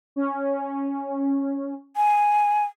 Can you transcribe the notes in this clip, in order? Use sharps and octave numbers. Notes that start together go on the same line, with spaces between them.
C#4
G#5